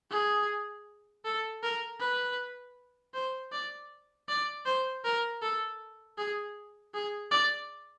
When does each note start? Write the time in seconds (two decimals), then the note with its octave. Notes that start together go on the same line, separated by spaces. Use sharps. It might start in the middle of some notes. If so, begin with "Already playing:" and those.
0.11 G#4
1.25 A4
1.63 A#4
2.00 B4
3.14 C5
3.52 D5
4.29 D5
4.66 C5
5.04 A#4
5.42 A4
6.18 G#4
6.94 G#4
7.31 D5